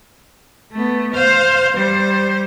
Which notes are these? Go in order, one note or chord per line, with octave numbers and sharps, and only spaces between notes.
A3 B3
C5 F5
G3 C5